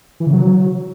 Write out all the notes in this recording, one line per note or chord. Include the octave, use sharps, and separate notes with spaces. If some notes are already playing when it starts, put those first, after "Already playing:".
E3
C#3
F#3